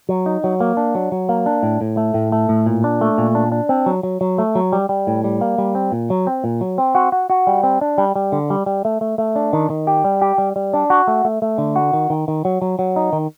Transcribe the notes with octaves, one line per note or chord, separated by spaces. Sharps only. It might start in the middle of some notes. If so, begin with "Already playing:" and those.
F#3
D#4
F#3
A#3
D4
F#3
F#3
A#3
D4
A2
A2
A3
A2
A3
A2
A#2
D4
A3
A#2
D4
D4
C4
F#3
F#3
F#3
A3
F#3
G3
G3
A2
G3
A#3
G3
C4
A#2
F#3
C4
A#2
F#3
C4
F#4
F#4
F#4
G3
C4
D4
G3
G3
D3
G3
G3
A3
A3
A3
D4
D#3
D#3
G4
G3
G4
G3
G3
D4
F#4
A3
A3
A3
D3
F#4
D#3
D#3
D#3
F#3
F#3
F#3
D#4
D#3